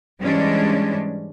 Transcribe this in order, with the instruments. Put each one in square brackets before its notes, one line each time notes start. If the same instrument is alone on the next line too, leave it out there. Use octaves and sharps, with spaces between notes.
[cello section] G#2 E3 G3 G#3 C#4 D4